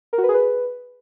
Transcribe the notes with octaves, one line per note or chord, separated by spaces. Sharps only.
A#4
F#4
B4
G#4
B4